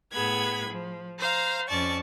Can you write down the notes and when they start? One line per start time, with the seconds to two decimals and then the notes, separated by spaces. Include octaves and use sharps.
0.13 A2 B3 G#4 B5 G#6
0.71 F3
1.20 C5 F5 A#5
1.68 F2 C#4 D5 A5 C#6